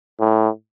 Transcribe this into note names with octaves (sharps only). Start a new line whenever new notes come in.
A2